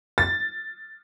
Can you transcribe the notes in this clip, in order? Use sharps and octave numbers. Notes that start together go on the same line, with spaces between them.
A6